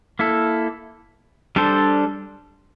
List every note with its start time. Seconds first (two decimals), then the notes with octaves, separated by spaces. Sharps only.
0.19 A#3 E4 A4
1.56 G3 D4 A4 C5